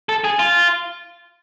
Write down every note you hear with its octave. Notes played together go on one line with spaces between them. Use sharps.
A4
G#4
F4